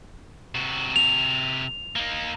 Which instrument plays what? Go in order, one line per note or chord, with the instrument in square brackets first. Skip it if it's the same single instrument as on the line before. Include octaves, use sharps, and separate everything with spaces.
[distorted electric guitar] C3 F#4
[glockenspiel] F7
[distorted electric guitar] A#3 D#4